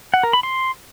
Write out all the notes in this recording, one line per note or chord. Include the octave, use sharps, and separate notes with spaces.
F#5
A#4
B5
C6